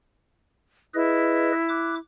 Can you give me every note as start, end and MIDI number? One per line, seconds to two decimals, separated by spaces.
0.94 1.98 64
0.94 1.52 68
0.94 1.52 71
0.94 1.52 75
1.68 1.95 86
1.68 1.95 90